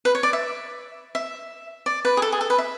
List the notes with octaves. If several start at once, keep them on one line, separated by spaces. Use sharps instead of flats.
B4
C#5
D5
E5
E5
D5
B4
G#4
A4
G#4
A4
B4
E5